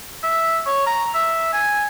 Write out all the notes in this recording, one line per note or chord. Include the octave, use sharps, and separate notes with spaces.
E5
C#5
A#5
E5
G#5